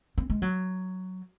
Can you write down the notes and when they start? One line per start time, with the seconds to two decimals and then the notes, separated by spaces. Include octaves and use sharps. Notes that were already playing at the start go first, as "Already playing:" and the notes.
0.18 C4
0.30 G#3
0.42 F#3